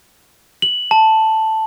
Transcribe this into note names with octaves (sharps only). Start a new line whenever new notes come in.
F#7
A5